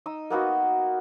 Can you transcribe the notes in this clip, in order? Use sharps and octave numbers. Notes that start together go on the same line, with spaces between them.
D#4 D#6 E6
A#3 B3 D#4 F#4